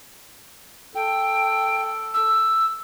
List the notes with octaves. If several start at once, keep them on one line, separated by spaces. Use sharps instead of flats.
A4 G5
E6